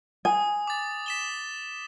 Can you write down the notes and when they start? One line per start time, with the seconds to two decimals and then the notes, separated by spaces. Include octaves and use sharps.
0.25 G#5 D#6
0.67 D6 A6
1.06 B6 E7 G7